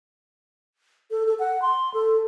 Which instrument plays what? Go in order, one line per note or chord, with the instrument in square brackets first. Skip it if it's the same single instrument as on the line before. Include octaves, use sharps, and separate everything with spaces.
[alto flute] A4
A4
F#5
C6
A4